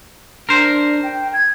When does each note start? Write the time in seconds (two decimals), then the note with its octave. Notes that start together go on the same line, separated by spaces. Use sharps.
0.49 D4 A#4 C5
1.03 G5
1.33 G#6